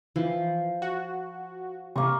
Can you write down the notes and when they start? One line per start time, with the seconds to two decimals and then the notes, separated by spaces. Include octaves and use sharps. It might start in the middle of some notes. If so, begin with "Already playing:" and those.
0.16 E3 F3
0.82 F#4
1.96 C3 A#3 C#6